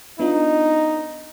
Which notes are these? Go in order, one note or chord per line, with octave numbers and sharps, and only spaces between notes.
B3 D4 D#4 F4